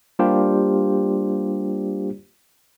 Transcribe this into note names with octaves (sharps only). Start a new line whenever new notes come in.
G3 A#3 D4 F4 G4 C5